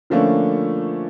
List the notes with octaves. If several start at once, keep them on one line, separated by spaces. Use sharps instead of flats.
D3 F3 A3 A#3 C#4 D4